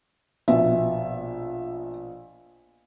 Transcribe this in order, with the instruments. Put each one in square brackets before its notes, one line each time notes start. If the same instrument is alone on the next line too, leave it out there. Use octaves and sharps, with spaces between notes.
[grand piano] A#1 B2 [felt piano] E5